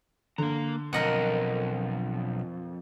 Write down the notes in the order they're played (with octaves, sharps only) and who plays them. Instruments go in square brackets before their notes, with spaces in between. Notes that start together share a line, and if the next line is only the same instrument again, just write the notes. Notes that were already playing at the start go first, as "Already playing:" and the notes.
[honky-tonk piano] D3 [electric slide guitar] A#3 A#5
[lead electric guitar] B1 [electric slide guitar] F2 [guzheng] A#4 D#5 F#5